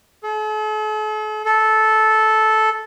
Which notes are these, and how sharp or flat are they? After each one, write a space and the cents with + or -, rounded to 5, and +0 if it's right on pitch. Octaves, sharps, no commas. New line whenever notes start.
A4 -45
A4 -10